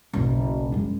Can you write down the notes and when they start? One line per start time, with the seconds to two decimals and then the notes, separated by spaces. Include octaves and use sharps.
0.13 F#1 B1
0.72 F#2 G#3